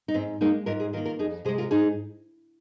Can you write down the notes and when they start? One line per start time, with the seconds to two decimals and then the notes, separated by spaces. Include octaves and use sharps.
0.08 D#4
0.14 G#2 C4
0.41 G#3 A#3 D#4
0.66 G#2 F4 A#4
0.80 G#4 C5
0.93 D#3 F4 A#4
0.97 A#3
1.05 F4 A#4
1.19 F2 D#4 G#4
1.45 C3 G#4 C5
1.48 G#3
1.58 F4 A#4
1.71 G#2 D#4 G#4